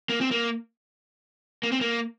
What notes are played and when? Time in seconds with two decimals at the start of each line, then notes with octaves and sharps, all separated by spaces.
0.09 A#3
0.21 C4
0.31 A#3
1.63 A#3
1.72 C4
1.81 A#3